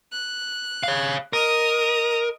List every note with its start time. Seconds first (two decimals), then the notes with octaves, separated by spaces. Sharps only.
0.12 F#6
0.83 C#5 F5
1.33 A#4 D#5 D#6